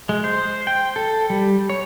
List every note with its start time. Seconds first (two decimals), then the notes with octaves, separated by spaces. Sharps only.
0.09 G#3
0.24 C5
0.67 G5
0.96 A4
1.30 G3
1.70 C#5